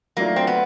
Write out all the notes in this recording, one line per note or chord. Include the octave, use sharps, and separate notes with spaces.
F#3 A3 A#3 D4 F4
C4
B3